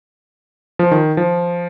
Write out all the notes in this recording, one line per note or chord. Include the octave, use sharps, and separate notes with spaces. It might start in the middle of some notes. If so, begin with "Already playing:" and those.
F3
D#3
F3